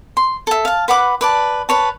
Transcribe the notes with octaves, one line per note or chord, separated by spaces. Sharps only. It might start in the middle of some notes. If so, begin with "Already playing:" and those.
C6
A4 E5
F5 A5
B4 F#5 B5 D6
B4 D5 A5
B4 C#5 A5